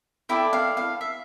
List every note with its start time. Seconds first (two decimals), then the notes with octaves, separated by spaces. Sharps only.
0.29 E4 A4 D5 G5
0.53 F5
0.77 F5
1.01 E5